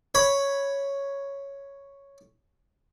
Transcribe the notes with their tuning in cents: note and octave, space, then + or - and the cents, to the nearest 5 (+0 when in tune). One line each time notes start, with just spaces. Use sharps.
C#5 +0 B5 +0